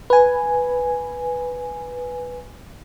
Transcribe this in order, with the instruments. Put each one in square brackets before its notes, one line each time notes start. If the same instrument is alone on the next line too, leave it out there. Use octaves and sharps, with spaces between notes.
[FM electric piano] B4 G#5